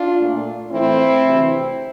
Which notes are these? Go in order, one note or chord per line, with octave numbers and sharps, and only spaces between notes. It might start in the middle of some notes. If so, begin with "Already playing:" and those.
Already playing: D4 F4
A#2 A3
A2 E3 A3 C4 E4
D2 C3 E3